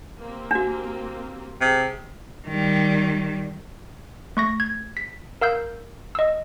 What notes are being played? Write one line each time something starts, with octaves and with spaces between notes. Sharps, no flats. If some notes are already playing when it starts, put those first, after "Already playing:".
A#3 C4 G4
D4 F#4
C3 G#4
D#3 G3
A3 C#6 A#6
G#6
B6
A#4 F5 E6 G6
D#5 E6